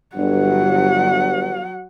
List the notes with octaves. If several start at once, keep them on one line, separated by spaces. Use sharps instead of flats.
G1 G2 F#3 F#5